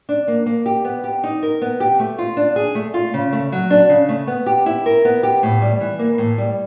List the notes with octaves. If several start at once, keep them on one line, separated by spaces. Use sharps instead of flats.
D4
A#3
A#3
G4
B3
G4
D#4
A#4
B3
G4
A3
F4
D4
G#4
A3
F4
C#3
A3
F#3
D4
C#3
A3
B3
G4
E4
A#4
B3
G4
A2
G3
E3
A#3
A2
G3